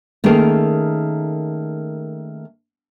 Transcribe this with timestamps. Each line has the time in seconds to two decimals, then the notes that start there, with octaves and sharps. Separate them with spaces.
0.24 D#3 A3 A#3 C#4 G#4 A#4